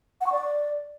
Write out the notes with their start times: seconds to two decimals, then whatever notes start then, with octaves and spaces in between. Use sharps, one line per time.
0.21 F#5
0.27 C#6
0.32 D5